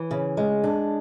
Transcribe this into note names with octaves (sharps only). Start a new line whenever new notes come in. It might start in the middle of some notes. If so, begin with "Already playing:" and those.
Already playing: E3
C#3
G#3
D4